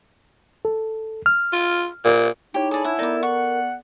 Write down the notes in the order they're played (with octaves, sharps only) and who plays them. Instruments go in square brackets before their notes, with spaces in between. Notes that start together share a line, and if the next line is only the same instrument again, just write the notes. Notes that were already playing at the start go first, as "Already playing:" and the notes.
[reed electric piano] A4
F6
[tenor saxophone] F4
A#2
[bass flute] D#4 [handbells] E4 C#5 [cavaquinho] G4
[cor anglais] G#4 [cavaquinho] A4 D5 [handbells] A5 B5
[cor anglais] E4 [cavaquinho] F#5 G#5
[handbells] B3 A4 D5 [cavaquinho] D#4 D6 [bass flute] A#4
[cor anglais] F#5 [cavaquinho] C#6